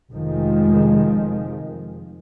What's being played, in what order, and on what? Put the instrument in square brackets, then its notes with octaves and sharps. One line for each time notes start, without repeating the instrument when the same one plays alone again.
[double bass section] F1 F2 D#3 F3 G#3